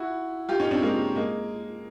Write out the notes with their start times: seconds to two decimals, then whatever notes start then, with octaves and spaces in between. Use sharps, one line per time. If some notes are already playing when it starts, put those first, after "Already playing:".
Already playing: E4 F#4
0.49 F4 G4
0.60 C#4 D#4
0.71 C4 D4
0.82 G#3 A#3
1.15 G#3 A#3